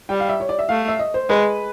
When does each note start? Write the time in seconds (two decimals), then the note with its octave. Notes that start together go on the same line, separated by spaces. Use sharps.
0.09 G3 G5
0.20 F5
0.29 E5
0.40 C#5
0.49 D5
0.59 E5
0.69 A3 F5
0.88 E5
0.99 D#5
1.14 C5
1.30 G#3 B4